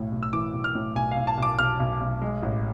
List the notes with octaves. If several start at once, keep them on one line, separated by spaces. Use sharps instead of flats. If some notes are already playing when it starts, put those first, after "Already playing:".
Already playing: B1 A2
B1
E6
E3 D6
B1
F6
A2
B1 G#5
F5
B1
A5
B1 D6
B1 F6
B1
B1
G#3
A1